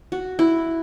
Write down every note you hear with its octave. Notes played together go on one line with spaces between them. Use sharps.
F#4
E4